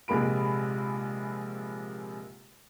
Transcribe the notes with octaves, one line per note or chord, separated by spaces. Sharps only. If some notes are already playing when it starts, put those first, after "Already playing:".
A#1 C3 G#3 A#3 B5 D7